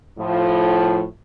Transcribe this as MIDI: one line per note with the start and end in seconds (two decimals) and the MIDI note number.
0.18 1.04 45
0.18 1.04 53